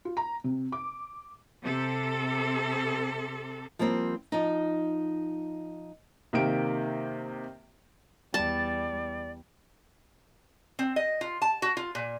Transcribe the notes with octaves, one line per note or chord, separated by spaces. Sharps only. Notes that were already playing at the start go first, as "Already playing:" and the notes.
F4
A#5
C3
D6
C3 A4
F3 G3 A#3 C4
F3 D#4
C3 D#3 A#3 G4 D7
E2 G3 D5 A5
C4
D#5
F4
A5
F#4
F4
A#2